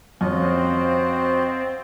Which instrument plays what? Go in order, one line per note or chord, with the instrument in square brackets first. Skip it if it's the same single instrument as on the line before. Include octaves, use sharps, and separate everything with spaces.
[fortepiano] F2 C#4 [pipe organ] C4 [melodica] F4 F#4 D#5